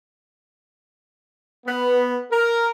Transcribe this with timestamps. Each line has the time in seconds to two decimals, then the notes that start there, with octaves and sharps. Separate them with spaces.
1.67 B3
2.31 A#4